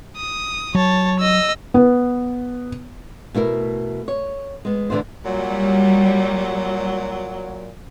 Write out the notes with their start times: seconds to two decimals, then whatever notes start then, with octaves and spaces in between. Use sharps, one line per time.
0.17 D#6
0.75 F#3 C#5 A5
1.19 D#5 E6
1.74 B3
3.35 B2 A3 E4 A#4
4.08 C#5
4.65 G#3 B3
4.90 D2 D3 E3 B3 C5
5.25 A#2 F#3 G3